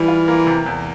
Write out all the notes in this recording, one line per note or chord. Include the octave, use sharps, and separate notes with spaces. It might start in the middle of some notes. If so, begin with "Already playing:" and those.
Already playing: E3 G3
F4
A#3
C3
E2